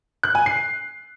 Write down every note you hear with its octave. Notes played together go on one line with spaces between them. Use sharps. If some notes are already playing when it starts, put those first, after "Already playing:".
F#6
G#5
C7